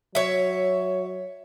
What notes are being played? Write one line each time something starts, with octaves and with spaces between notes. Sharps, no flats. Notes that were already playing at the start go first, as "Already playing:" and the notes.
F#3 C#5 E5